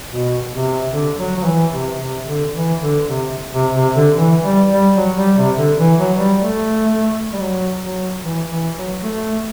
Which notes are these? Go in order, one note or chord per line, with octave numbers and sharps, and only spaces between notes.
B2
C3
D3
F#3
F#3
E3
C3
C3
D3
E3
D3
C3
C3
C3
D3
E3
G3
G3
F#3
G3
C3
D3
E3
F#3
G3
A3
G3
F#3
F#3
E3
E3
F#3
A3